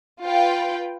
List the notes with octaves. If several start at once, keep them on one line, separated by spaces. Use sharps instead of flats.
F4 B4 G5